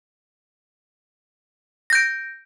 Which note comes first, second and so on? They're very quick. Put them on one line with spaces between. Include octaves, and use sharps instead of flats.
A#6 G6 D7